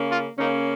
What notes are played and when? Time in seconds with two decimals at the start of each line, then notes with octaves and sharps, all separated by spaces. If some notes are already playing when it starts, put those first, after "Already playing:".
Already playing: C#3 A#3 C#4
0.11 F4
0.38 C#3 A#3 C#4 D#4